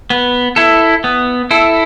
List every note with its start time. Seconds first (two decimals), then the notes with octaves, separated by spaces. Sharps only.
0.10 B3
0.56 E4 A4
1.04 B3
1.51 E4 A4